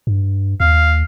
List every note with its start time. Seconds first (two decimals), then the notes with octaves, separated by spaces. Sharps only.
0.07 G2
0.60 D#2 F5